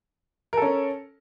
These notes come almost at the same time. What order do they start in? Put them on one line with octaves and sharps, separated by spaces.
A#4 A4 C#4